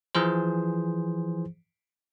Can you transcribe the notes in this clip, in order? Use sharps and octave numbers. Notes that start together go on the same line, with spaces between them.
E3 F3 G#4 C5